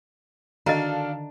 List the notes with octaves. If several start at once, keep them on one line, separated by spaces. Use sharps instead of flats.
D3 D#3 D4 F#4 A4 D#5 F5 A#5